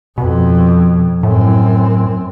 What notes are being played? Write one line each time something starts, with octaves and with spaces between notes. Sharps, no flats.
F2 B2
F#2 A2 C4